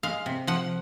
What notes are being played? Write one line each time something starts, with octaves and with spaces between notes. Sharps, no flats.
G#3 F5
C3
F3 F#5